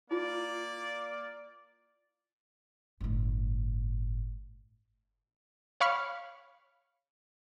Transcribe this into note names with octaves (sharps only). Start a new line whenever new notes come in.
A#3 E4 F4 D5
G1 A2
C#5 F5 B5 C#6 F6 C#7